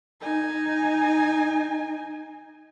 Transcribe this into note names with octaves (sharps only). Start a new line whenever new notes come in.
D#4 G#5